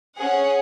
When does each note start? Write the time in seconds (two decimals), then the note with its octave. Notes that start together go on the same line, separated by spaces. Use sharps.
0.16 C#4 G#4 F#5